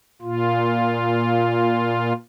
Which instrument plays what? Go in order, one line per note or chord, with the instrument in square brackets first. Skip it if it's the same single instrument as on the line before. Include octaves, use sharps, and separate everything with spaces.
[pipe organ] A#2 F4